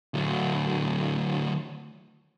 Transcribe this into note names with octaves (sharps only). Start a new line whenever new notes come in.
D2 F#3